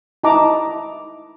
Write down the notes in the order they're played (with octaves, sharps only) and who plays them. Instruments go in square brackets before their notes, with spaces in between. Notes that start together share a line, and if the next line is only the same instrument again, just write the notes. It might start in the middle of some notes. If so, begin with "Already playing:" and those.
[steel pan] D#4 E4 D#5 A5 A#5 D6